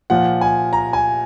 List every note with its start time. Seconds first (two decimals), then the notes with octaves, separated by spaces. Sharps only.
0.10 A#2 F3 F#5
0.41 G#5
0.73 A#5
0.93 G#5